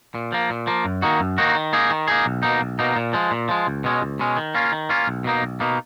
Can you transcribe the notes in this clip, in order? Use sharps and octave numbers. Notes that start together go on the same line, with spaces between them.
A#2
F3 A#3
A#2
F3 A#3
F#2
D#3 A#3 D#4 F#4
F#2
D#3 A#3 D#4 F#4
D#3
A#3 D#4 G#4
D#3
A#3 D#4 G#4
B1
B2 A#3 D#4
B1
B2 A#3 D#4
A#2
F3 G#3
A#2
F3 G#3
C#2
B2 G#3 C#4
C#2
B2 G#3 C#4
D#3
A#3 C#4 F4
D#3
A#3 C#4 F4
B1
B2 A#3 D#4
B1
B2 A#3 D#4